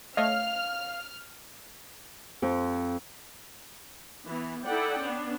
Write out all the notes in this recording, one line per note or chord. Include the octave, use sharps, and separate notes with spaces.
A3 C#5 D#5 F5 F6
F2
E3 B3
D#4 E4 A4 D5 F#5 G5
B3 C#4 D4